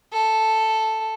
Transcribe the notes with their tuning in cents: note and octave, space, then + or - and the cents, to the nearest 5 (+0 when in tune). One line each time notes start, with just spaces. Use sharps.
A4 +0